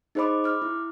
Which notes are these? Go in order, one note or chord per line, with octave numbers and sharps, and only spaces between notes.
D#4 G#4 C5 D#5 B5 D6
D6 F6
E4